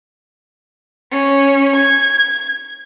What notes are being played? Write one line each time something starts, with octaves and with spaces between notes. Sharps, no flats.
C#4
G#6